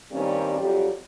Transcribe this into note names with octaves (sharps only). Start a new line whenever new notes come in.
G2 D#3 G3 A#3 C4 C#4
F2 F#3 G3 G4